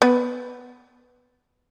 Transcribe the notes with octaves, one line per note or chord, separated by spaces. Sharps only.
B3 B4